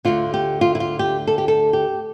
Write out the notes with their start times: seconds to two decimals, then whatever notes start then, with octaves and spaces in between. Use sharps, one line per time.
0.05 D2 D3 F4
0.34 G4
0.61 F4
0.75 E4
0.80 F4
0.99 G4
1.27 A4
1.38 G4
1.48 A4
1.73 G4